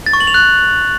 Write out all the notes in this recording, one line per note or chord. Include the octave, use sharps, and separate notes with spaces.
A6
C#6
F#7
F7
F#6